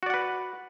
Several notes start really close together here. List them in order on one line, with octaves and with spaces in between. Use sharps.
F#4 D5 F#5 B4